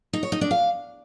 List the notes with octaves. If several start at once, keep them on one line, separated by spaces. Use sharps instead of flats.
D#4
C#5
D#4
D4
F5